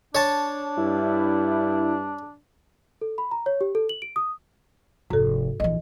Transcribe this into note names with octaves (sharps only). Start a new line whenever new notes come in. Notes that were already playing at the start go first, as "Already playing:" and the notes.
D4 C#5 A5
G2 E4
A4
B5
A#5
C#5
G4
A4
F#7
D7
D#6
F1 G#2 A4
A#1 E3 D#5